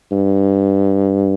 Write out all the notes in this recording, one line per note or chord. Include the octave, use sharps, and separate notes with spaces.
G2